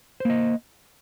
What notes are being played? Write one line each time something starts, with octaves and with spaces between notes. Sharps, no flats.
A#3 C5 D#5